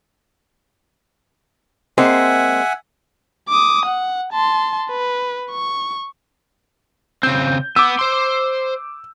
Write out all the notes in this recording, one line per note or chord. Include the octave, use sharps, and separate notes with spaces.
G#3 A#3 C4 E5 F#5 G#5
D6 D#6
F#5
A5 C6
B4
C#6
C#3 C4 G6
B3 D6 E6
C5 C6